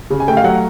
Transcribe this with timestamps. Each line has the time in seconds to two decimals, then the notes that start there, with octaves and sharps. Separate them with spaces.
0.10 C#3
0.20 G#5
0.28 A3 G5
0.37 F5
0.44 F#3 F#5